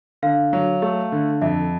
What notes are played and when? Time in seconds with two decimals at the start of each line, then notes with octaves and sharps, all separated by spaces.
0.22 D3 F5
0.53 F#3
0.82 A3
1.12 D3
1.42 F2 E5